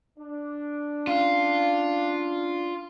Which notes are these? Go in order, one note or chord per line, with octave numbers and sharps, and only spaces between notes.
D4
C#4 F4 F5 F6